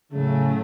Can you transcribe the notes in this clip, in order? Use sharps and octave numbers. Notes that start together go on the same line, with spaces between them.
A2 C#3 F#3 A3